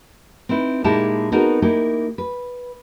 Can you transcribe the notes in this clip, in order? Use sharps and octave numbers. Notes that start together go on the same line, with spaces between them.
C4 D#4 E4 B4
A#2 G#3 D#4 E4 G4 A5
B3 C4 D#4 F#4 G#4 A#4
A#3 D#4 E4 G4
B4